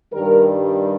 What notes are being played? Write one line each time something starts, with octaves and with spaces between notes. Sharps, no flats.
G2 D#3 G3 A#4